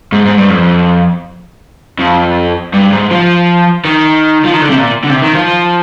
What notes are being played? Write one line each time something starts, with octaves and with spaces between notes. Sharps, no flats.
G#2
G#2
G2
F2
F2
G2
G#2
F3
D#3
F3
D#3
D3
C3
A#2
D3
C3
D#3
F3